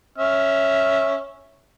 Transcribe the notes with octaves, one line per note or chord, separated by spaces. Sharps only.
C#4 E5 F6